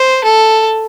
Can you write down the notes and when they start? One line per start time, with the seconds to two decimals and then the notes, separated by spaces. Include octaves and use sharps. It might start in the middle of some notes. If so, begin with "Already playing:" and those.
Already playing: C5
0.24 A4